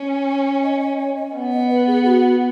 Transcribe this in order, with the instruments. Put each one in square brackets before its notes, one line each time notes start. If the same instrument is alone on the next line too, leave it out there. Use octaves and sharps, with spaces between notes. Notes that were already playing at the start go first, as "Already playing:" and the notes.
Already playing: [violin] C#4
[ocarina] D#5
D#5
C#5
D#5
[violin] B3
[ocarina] D#5
B4
G#4
F#4